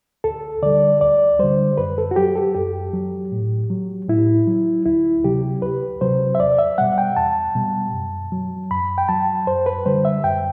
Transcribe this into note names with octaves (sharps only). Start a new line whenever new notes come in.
D2 A4
D3 G3 D5
D2 D5
D3 G3 C5
F#2 B4
A4
F#4
F#3 G4
A4
F#2 G4
F#3
A2
F#3
A2 E4
F#3
D2 E4
C3 F#3 G4
D2 B4
C3 F#3 C5
E5
E2 D5
E5
B2 G3 F#5
G5
E2 A5
B2 G3
F#2
F#3
F#2 B5
G5
F#3 A5
F#2 C5
B4
D3 G3 C5
E5
F#2 G5